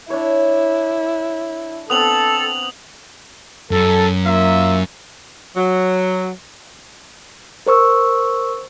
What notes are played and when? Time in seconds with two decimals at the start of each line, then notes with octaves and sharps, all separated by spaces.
0.10 D4 E4 C#5
1.90 B3 C4 D4 A4 D#6 F7 F#7
3.71 F#2 A4
4.26 A#3 F4 E5
5.55 F#3
7.66 A#4 C5 C#6 E6